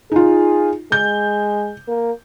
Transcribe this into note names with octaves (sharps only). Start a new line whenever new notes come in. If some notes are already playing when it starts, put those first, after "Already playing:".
D#4 F4 G#4
G#3 G6
A#3